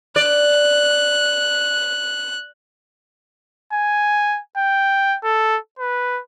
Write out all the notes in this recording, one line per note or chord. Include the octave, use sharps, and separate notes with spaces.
D5 F#6
G#5
G5
A4
B4